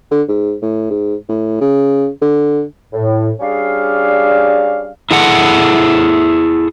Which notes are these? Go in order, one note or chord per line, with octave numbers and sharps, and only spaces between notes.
D3
G#2
A2
G#2
A2
C#3
D3
A2
G3 C#4 D4 G#4 F5
E4 G#4 A4 F#5